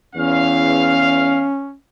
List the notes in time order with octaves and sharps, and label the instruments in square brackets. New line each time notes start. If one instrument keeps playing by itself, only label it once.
[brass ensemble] E2 F5 [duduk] C#4